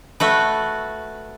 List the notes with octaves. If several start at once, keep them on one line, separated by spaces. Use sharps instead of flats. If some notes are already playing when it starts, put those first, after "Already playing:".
A3 F#4 B4